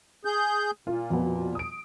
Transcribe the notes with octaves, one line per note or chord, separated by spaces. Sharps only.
G#4 G6
A#2 F4
F2 B2 B3
D#6 D7